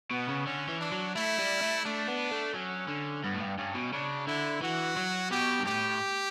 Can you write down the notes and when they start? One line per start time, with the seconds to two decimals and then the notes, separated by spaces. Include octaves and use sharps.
0.11 B2 B3
0.29 C#3
0.46 D3 C#4
0.68 E3
0.81 D4
0.92 F#3
1.15 A3 E4
1.39 G3
1.62 A3
1.85 A3 D4
2.07 B3
2.31 A3
2.54 F#3 C#4
2.88 D3
3.24 G2 B3
3.33 A2
3.41 G2
3.58 G2 C#4
3.75 B2
3.93 C#3 D4
4.27 D3 E4
4.62 E3 F#4
4.97 F#3
5.31 B2 G4
5.60 G2
5.66 A2 G4